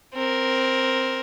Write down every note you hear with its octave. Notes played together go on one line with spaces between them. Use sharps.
C4 A#4